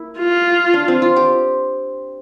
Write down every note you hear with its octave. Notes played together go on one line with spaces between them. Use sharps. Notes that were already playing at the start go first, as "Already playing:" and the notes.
Already playing: A#3 E4
F4
D4
C4
F4
G4